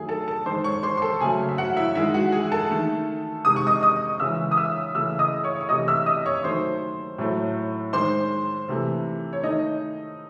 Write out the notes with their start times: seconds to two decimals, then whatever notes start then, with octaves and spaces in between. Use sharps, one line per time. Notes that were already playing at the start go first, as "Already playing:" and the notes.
Already playing: D#3 F#3 A3 G#4 G#5
0.09 A4 A5
0.28 A4 A5
0.46 D#3 C5 C6
0.49 G#3
0.64 C#5 C#6
0.83 C5 C6
0.97 C6
1.02 A4 A5
1.20 C#3 F#3 A3 G#4 G#5
1.49 E5
1.58 F#4 F#5
1.77 E4 E5
1.95 D#3 G#3 E4 E5
2.14 F#4 F#5
2.32 G#4 G#5
2.52 A4 A5
2.71 D#3 A3
3.45 C3 D#3 G#3 D#6
3.56 C#6
3.67 D#5 D#6
3.82 D#5 D#6
4.20 C#3 E3 G#3 E5 E6
4.51 D#6
4.57 E5 E6
4.95 C#3 E3 A3 E5 E6
5.19 D#5 D#6
5.44 C#5 C#6
5.61 C#6
5.69 C3 E3 A3 D#5 D#6
5.88 E5 E6
6.06 D#5 D#6
6.26 C#5 C#6
6.44 D#3 F#3 A3 C5 C6
7.18 A2 F#3 A3
7.93 D#3 G#3 C5 C6
8.69 C3 E3 A3
9.33 C#5
9.43 D#3 A3 D#4 D#5